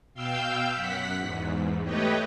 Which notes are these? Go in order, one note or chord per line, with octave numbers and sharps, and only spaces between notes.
B2 F5 G5 E6 G6
F#2 F#5 B6
E2 G#2
A3 G4 B4 C#5 D#5 G5